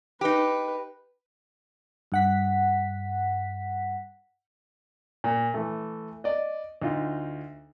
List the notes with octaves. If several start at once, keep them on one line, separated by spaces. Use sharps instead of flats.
D#4 G4 B4
G2 F#5 B6
A#2
E3 A3
D5 D#5
D2 D#4 F4